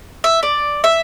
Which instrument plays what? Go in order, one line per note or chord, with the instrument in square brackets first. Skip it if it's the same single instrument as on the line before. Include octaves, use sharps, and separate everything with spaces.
[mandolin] E5
D5
E5